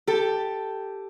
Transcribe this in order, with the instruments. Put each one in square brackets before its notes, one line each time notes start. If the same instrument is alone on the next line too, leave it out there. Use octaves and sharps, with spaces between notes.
[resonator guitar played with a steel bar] G4 A4